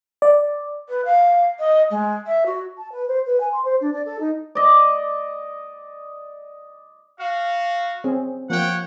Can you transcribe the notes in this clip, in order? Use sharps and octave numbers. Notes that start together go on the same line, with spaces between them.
D5
B4
F5
D#5
G#3
E5
F#4
A5
B4
C5
B4
G#5
C6
C5
D4
D5
A4
D#4
D5 D#5
F#4 F5
C4 C#4 G#4
F3 A#3 C#5 F#5 G5